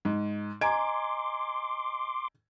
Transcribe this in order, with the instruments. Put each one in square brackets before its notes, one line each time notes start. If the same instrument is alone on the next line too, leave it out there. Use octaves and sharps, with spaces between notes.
[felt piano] G#2
[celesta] D#5 G#5 A#5 [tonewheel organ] C6 D6 [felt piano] G#6 D7